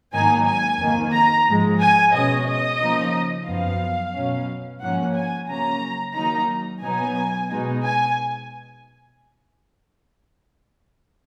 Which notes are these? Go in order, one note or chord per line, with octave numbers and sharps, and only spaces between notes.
G#2 D#3 F#3 A#3 D#4 G#5
G#5
F2 D#3 A#3
A#5
G#2 F3 G#3
G#5
B2 G#3 C#4 D#5
D#5
C#3 F3 A#3 D#4
F#2 F3 B3 F5
B2 F#3 C#4
G#2 F3 A#3 C#4 F#5
G#5
C#3 F#3 A#3 C#4 A#5
D#3 F#3 A#3 D#4 A#5
B2 F#3 B3 D#4 G#5
B2 G#3 D#4
G#5